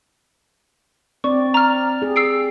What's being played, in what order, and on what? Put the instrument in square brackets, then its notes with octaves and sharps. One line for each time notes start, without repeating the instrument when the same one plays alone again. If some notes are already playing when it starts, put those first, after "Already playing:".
[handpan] C4 D5 [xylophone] C#6
[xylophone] A#5 F6
[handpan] G4 G#4
[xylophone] E6 C7 D7